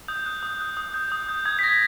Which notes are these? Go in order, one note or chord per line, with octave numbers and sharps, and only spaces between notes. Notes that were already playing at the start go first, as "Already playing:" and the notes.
D#6 G6
F#6
D#6
F#6
D#6
G6
D#6
G6
D#6 G#6
B6
G6 A#6